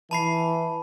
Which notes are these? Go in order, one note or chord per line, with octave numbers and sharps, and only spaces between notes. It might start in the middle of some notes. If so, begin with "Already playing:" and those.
E3 A5 B5 C7